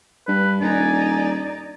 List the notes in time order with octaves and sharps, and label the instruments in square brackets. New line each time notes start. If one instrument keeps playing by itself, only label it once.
[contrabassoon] G2 [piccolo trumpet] B4
[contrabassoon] D#1 [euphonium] D4 [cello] D#4 D5 [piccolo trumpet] G#5